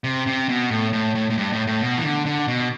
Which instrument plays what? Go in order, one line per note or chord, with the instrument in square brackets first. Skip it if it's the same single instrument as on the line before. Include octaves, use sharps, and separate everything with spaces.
[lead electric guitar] C3
C3
B2
A2
A2
A2
A2
G2
A2
A2
B2
E3
D3
D3
B2